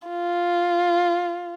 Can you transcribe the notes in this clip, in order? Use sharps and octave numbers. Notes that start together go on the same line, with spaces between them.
F4